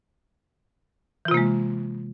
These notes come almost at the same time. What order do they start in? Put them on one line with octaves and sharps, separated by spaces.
E3 F4 C3 A#3 G#3